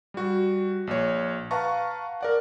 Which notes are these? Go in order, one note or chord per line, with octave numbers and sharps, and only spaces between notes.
G3 F#4
A#1 C#5
B4 F5 F#5 A5 A#5 C#6
A#4 D5 F#5